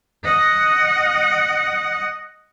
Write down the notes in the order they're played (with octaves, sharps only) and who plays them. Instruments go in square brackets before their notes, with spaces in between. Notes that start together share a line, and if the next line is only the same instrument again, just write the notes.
[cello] D#5 F#5